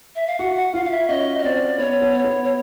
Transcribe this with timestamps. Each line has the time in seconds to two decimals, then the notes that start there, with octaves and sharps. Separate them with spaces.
0.15 E5
0.27 F5
0.39 F#4 F#5
0.56 F#5
0.74 F4 F5
0.85 F5
0.91 E5
1.08 C#4 D#5
1.39 D#5
1.43 C4 D5
1.78 B3 C#5
2.02 B3
2.13 C#5
2.24 B3
2.44 C#5